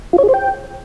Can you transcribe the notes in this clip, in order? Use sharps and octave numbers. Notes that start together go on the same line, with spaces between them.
F4
C#5
G#4
C5
G5